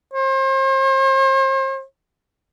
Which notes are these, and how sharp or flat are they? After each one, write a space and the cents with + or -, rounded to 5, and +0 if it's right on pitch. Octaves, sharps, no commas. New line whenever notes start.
C5 +40